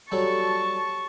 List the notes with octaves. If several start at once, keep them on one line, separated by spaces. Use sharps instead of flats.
F#3 G3 A4 A5 C#6